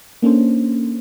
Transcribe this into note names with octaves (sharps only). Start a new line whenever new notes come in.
A#3 C#4 D4 A4 C5